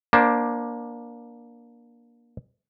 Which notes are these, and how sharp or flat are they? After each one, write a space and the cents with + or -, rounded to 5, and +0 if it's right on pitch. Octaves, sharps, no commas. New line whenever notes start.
A#3 +20 D4 +0 C5 +0